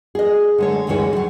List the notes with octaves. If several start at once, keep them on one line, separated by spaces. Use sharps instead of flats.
G#4 D#5
D3 G#3 C#5
D2 G2 D#3 E3 G#3 C#5
D#3 F#3